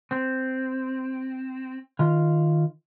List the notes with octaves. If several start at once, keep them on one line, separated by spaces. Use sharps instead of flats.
C4
D#3 F4